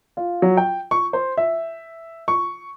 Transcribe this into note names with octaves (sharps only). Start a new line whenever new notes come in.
F4
F#3
G5
C#6
C5
E5
C#6